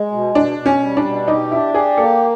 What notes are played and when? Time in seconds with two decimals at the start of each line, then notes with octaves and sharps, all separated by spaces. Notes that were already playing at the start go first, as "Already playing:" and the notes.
Already playing: G#3
0.12 B2
0.35 B2 D4
0.58 B2
0.66 C#4
0.82 G3
0.97 D4
1.05 B2
1.28 D#4 G4
1.51 D4 E4
1.74 G4 G#4
1.98 A#3 A4